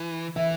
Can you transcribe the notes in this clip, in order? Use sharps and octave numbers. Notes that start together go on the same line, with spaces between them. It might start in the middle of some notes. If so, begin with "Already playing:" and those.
Already playing: E3
E3 E5